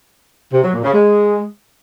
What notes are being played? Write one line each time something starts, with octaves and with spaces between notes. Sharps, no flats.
C3
F#3
A#2
C#3
G#3